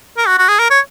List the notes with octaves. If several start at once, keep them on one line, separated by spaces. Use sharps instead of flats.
A#4
F#4
F#4
G#4
A#4
C#5